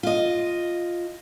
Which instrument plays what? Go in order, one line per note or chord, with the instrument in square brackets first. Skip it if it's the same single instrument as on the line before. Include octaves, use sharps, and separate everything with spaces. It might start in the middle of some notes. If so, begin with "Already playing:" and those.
[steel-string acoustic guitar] F4 D#5